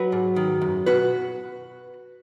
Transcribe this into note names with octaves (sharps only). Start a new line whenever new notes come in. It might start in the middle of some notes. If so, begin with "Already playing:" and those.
Already playing: F#3 F#4 B4
G#2
D#3
F#2
B2 F#4 B4